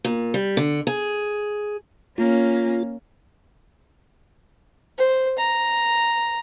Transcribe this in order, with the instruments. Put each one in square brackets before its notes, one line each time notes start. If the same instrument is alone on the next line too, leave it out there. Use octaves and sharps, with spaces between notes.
[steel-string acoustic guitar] A#2
G3
D3
G#4
[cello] A#3 C#4 [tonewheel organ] F4
[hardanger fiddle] C5
A#5